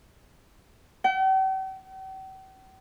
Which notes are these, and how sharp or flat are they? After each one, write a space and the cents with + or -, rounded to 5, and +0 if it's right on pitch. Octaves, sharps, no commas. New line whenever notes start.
G5 -45